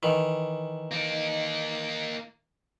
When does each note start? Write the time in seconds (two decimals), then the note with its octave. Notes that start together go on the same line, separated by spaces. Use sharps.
0.03 D#3 E3
0.91 A#3 D#4